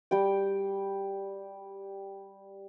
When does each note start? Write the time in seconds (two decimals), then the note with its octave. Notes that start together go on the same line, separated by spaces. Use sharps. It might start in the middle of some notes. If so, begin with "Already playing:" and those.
0.11 G3 G5